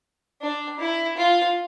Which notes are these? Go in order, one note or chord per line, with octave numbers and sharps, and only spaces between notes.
D4
E4
F4